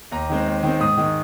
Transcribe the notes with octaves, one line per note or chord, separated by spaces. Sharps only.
D#2 A#5
D#3 G#3 C4
D#2
D#3 G#3 C4
G#2 D#6
D#3 G#3